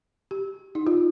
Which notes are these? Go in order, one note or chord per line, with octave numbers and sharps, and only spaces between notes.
G4
D#4
F4